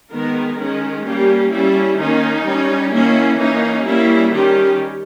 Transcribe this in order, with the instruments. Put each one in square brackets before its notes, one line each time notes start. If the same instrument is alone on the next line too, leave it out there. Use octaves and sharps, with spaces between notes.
[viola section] D#3 G#3 B3 A#4
D#3 G#3 C#4
G3 A#3 C#4 G4
G3 C#4 E4
D#3 A#3 C#4 D#4
G3 C#4
D#3 A#3 C#4 E4
E3 A#3 C#4 D#4
G3 A#3 C#4 E4
D#3 G3 C#4 G4